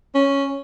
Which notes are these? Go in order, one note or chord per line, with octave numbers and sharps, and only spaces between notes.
C#4